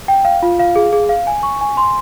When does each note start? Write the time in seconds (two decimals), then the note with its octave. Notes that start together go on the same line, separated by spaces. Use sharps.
0.08 G5
0.25 F5
0.42 F4
0.59 F5
0.76 G#4
0.93 G#4
1.09 F5
1.27 G#5
1.43 C#6
1.61 G#5
1.77 C6